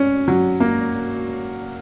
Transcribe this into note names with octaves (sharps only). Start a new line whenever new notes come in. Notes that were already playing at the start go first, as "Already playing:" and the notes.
Already playing: C#4
F#3
A#3